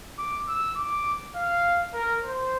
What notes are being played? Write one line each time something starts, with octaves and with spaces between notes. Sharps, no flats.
D6
E6
D6
F5
A#4
C5